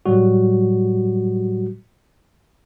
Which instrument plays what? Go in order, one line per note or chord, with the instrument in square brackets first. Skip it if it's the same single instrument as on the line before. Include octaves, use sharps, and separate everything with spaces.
[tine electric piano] A2 F#3 G3 F#4